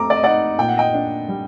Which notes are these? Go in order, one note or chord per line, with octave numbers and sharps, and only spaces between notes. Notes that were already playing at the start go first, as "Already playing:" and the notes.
Already playing: A3 C4 A#5 D6
D5
D#5
D#4 D5 F#5
A#2 G5
F#5
D#5 G5
D4
G3